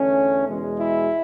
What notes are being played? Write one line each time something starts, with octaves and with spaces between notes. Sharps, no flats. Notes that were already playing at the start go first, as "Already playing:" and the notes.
Already playing: E2 D3 A3 C#4
E2 B2 G#3
E4